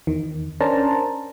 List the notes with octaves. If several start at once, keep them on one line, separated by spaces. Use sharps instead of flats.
E2 D#3
C#4 D4 A#4 C5 A5 A#5